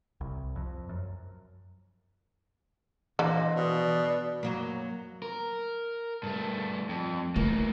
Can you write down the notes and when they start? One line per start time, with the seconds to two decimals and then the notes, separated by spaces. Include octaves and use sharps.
0.21 C2
0.56 F2
0.89 F#2
3.19 A#2 D3 E3 C5 D#5 F5
3.56 B2 D5 D#6
4.43 F#2 F#3 A#3
5.22 A#4
6.23 G2 A3
6.89 F2
7.36 E3 A3 A#3